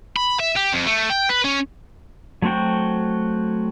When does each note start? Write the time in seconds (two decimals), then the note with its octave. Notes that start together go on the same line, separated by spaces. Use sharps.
0.16 B5
0.40 E5
0.57 G4
0.73 F2
0.86 A3
1.10 G5
1.29 B4
1.45 C#4
2.42 F#3 A3 C4 F#4 G5